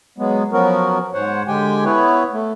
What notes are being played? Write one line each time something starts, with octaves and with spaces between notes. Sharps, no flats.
F#3 G#3 B3
F3 F#3 B3 C#4 F#4 A#4
G#2 C5 C#5 F#5
D3 G#3 G4 G5 G#5
B3 E4 B4 C#5
A3